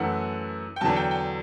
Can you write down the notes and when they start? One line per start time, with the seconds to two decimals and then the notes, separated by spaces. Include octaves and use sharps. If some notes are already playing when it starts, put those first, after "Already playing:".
Already playing: F#2 E3 A3 F#5
0.76 G5
0.81 E2 D3 F#3 A5
0.96 G5
1.11 G5